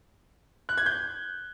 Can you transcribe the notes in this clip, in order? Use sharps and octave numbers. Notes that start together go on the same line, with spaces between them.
F#6
G#6
G6